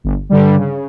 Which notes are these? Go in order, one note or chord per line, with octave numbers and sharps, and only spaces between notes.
G1
G2 D3 G3
C#3